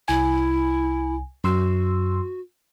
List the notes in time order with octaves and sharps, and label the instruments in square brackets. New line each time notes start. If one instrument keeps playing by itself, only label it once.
[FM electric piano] C2 G#5 [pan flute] E4
[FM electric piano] F#2 C6 E6 [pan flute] F#4